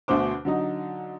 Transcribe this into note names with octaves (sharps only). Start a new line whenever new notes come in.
D2 B2 D3 C5 D6
D3 F#3 D#4